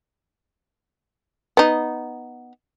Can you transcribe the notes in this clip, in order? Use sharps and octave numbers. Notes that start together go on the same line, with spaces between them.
B3 D#4